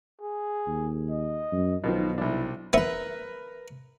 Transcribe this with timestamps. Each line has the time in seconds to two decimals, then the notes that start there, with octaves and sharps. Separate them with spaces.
0.21 G#4
0.67 D#2
1.10 D#5
1.52 F#2
1.84 B1 B2 D#3 F3
2.18 C2 D4 E4
2.73 B3 A#4 B4 E5